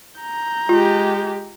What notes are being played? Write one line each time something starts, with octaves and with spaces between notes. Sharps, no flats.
A#5 G6
G#3 F4 G4